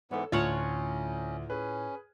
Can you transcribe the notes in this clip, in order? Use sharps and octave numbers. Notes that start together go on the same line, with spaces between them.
G#2 E3 B3 A4 C#5
D2 A2 C#4 F4 C#5 F#5 A5 F6
C#4 G#4 B4